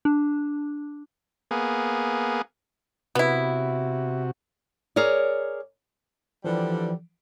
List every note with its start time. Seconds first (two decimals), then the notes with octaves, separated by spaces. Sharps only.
0.05 D4
1.51 A#3 B3 G#4
3.15 C3 B3 E4 F#4
4.96 G#4 A#4 C#5 D5
6.44 D3 E3 F3 G3